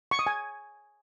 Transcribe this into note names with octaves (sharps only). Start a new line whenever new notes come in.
C#6
D#6
G#5